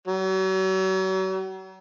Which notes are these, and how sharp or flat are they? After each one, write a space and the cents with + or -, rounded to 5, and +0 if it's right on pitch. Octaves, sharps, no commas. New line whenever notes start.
F#3 +40